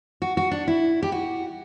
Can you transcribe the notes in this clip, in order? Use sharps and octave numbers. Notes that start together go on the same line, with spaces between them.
F#4
F#4
D4
E4
G4
F#4